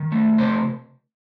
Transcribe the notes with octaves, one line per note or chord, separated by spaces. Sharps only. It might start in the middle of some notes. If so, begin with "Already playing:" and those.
Already playing: D#3
A3
C3 C5